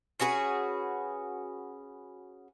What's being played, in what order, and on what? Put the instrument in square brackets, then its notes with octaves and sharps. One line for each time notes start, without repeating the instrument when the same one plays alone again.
[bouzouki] C#4 F#4 G#4 B4